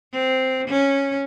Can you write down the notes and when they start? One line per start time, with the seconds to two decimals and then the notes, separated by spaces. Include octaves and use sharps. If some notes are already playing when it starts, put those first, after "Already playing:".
0.12 C4
0.68 C#4